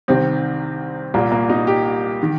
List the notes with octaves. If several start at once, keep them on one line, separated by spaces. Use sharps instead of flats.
C2 C3 D#3 C4
C2 A#2 A#3
A#3
D#4
G4
D#3